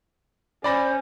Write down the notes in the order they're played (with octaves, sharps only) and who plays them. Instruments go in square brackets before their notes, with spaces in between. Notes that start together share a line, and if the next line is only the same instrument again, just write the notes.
[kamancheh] C#4 [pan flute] C5 [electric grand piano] D5 B5 A#6